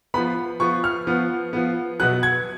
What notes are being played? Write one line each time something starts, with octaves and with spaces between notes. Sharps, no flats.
F3 B3 B5
F3 B3 C#6
F6
F3 B3
F3 B3
B2 F#3 B3 F#6
G#6